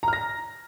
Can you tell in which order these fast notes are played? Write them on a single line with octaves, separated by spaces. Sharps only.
A#5 F6 A#6